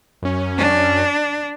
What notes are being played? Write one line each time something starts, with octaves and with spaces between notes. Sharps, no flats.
F#2 C#4
D4